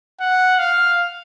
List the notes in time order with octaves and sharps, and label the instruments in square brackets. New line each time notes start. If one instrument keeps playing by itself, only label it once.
[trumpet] F#5
F5